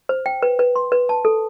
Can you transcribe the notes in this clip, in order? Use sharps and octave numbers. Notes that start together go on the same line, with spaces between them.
C5
G5
B4
B4
C6
B4
A5
A4